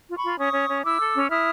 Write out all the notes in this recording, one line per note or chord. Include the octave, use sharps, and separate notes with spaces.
F4
B5 C#6
F4
C#4 C#6 D#6
C#4
C#4
E4 D6 E6
A4
C#4
E4 D#6 F6